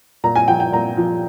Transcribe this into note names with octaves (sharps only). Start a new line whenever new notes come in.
A#2 A#5
G#5
F3 G5
G5
A#2 A#5
F3